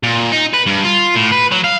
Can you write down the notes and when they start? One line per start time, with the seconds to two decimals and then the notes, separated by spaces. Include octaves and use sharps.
0.03 A#2
0.32 D#4
0.54 B4
0.67 G2
0.85 F4
1.16 A2
1.32 B4
1.52 F#3
1.64 F5